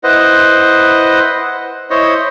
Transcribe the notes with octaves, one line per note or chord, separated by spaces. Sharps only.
E4 B4 C5 D#5 F#5
E4 C5 C#5 D#5